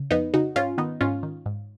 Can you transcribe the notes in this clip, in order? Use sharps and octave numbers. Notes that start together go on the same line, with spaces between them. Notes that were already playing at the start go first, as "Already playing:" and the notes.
Already playing: C#3
F2 B3 D#4
C#3 D#4 F#4
G#2 C#4 F4
D#3 B3 D#4
G#2 C#4 F4
D#3
G#2